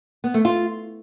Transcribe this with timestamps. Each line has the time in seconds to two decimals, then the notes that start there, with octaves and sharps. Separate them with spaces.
0.24 B3
0.34 A3
0.45 F4